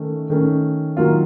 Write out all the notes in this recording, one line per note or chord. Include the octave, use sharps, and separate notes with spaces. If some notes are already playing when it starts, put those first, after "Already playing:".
Already playing: D#3 A3 C#4
D#3 A3 C#4
D#3 F#3 A#3 F4